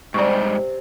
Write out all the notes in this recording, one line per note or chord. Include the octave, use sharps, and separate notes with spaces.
G#2 C3 G3 D5 C#6